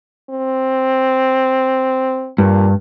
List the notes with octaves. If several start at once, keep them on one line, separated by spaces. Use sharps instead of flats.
C4
G2 A#2